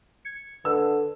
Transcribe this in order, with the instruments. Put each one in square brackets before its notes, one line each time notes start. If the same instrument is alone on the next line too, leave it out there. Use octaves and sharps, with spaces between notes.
[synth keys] G#6 C#7
[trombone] D3 [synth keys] B4 [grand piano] E6